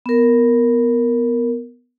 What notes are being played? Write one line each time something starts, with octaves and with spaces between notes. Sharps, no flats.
B3 A#4